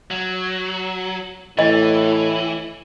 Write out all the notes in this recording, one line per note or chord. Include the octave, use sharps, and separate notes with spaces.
F#3
A2 E3 D#5